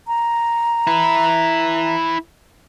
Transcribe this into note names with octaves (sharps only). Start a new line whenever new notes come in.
A#5
E4 B4